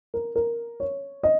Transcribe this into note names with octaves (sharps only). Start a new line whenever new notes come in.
A#4
A#4
C#5
D#5